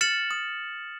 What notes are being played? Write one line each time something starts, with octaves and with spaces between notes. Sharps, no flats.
F6 A6 C#7 E7 F#7
D#6